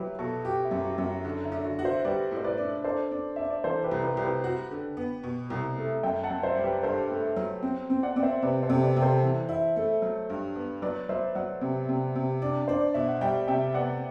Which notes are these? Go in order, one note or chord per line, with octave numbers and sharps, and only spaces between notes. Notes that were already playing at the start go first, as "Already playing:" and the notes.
Already playing: F#3 E4 G4 B4
B2 F#4 A4
F#4 G4
E4
F#2
F#4
F#2
F#4
D3 F#4
E4
D3
F#4
F#4
C5 E5
G3 B4 D5
A2
C5
B4 D5
D4
D4 A4 C5
D4
D4 E5
D5
E3 A4 C5
G4 B4
C2
G4 B4
C2
G4 B4
F#4
D3
B3
B2
C2
A3
F#2 E5 G5
F#5 A5
F#2
C5 E5
G3
G4 B4
G2 A4 C5
A3
F#3
C4
C4
D5 F#5
C4 D5
C5 E5
C3 B4 D5
A4 C5
C3
B4 D5
C3
A4 C5
E3
E4
A3
F#3
G2
B3
F#3 B4 D5
F#3 C5 E5
F#3 D5 F#5
C3
C3
C3
D4
D4 C5
D5
B2 E5
F#5
G3 E5 G5
C3 E5 G5
B3 D5 F#5